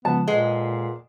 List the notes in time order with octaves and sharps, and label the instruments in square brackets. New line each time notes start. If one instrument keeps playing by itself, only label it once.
[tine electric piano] C#3 F3 G#3 [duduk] B3 [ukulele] A5
[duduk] A#2 [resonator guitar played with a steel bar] G#3 [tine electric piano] A4 B4 F#5